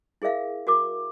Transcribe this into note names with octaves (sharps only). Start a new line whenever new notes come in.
E4 G#4 A#4 E5 F5
F#4 A#4 D6